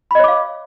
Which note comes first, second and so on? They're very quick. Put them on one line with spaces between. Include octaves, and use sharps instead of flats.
B5 D#5 C#5 D6 F5